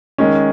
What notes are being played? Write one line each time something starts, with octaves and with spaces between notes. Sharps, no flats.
D#3 G#3 C#4